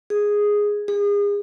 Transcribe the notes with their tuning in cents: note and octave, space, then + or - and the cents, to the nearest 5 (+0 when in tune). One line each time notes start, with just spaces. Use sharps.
G#4 -5
G#4 -35